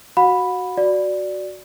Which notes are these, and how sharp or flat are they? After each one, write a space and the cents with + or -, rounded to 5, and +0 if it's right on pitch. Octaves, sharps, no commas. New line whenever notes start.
F#4 +0 F#5 -40 B5 +0
F#4 +0 D5 +0